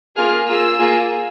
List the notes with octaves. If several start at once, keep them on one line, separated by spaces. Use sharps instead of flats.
A#3 F4 G#4 F6
A#3 F4 G#4 E6
A#3 F4 G#4